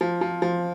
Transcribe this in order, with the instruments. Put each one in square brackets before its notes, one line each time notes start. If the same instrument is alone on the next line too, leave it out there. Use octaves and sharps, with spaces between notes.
[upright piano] F3
F3
F3